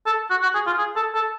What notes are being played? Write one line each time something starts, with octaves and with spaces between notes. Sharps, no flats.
A4
F#4
F#4
G#4
F4
G#4
A4
A4